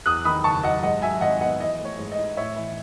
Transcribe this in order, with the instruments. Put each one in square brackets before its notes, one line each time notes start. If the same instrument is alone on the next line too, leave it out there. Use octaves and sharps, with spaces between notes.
[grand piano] E2 D#6 F#6
D#3 B5 D#6
F#1 A5 C#6
F#3 D#5 F#5
G#2 D#5 F#5
F#3 E5 G#5
G#1 D#5 F#5
B3 D#5 F#5
E3 D#5
A3
C#5
G#2
D#5
D#4
A2 C#5 E5
E3